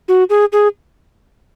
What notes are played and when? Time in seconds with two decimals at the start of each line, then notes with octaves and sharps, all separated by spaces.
0.08 F#4
0.30 G#4
0.52 G#4